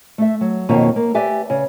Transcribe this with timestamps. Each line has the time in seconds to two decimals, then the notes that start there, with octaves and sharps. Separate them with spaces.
0.18 A3 E5
0.41 F#3
0.69 F2 B2 D#3 A#3 F4 C#5
0.96 A#3
1.15 G4 B4 D5 E5 G#5
1.50 C#3